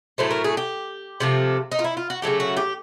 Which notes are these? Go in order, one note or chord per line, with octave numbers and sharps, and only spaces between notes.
A2 F#3 A3 C5
A#4
G#4
G4
C3 F3 A3
D#4
F4
E4
F4
F#4
C#3 F#3 A3 G4
F#4
G4